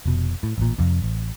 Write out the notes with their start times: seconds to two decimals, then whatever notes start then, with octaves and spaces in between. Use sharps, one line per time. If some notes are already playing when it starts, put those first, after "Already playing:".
0.06 F1 B2
0.43 A2
0.58 A1 A#2
0.78 F2 C3
1.02 A1